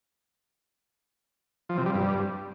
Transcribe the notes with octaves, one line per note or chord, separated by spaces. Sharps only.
F3
C3
G3
G2